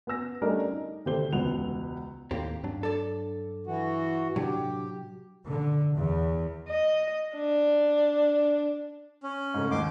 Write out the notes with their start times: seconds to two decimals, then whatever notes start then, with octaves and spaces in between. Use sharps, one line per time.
0.07 B3 B4 G#5 E6 A#6
0.42 G3 A3 C#4 D4 A#4 D#5
0.71 D#4
1.06 D2 C3 G4 A4 C5 G7
1.33 E1 C#2 B3 F#5 F7
2.31 D#2 A2 A#3 C4 G4
2.63 G2 F#3 D4
2.83 A4 D5
3.67 E3 F#4
4.36 A2 C3 F#3 D4 G4
5.45 D3
5.94 E2
6.68 D#5
7.35 D4
9.23 C#4
9.54 G#2 C#3 A3
9.71 D#2 G#2 C6 D6